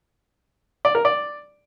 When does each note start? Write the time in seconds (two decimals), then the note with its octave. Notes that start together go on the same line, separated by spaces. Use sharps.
0.85 D5
0.95 A#4
1.05 D5